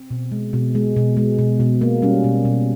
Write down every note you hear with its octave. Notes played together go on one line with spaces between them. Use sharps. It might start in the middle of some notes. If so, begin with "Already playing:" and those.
Already playing: C4
B2
G#3
B2
G#3
B2
G#3
B2
B2
A#3
G3 C#4
B2
B2